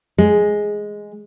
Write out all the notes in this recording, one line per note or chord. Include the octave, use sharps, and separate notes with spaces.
G#3